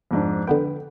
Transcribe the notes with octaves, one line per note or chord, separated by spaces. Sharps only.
F2 G#2 D4
D3 B3 B4 G5